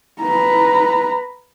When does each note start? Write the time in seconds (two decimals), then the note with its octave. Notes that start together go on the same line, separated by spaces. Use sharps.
0.22 B4 A#5